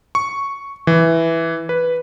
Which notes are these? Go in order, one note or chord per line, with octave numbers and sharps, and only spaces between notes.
C#6
E3
B4